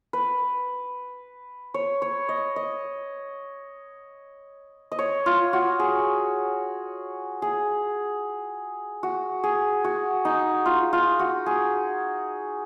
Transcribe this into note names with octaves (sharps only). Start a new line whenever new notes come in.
B4
C#5
C#5
D#5
D#5
D#5
C#5
F4
F#4
G#4
G#4
F#4
G#4
F#4
D#4
F4
F4
F#4
G#4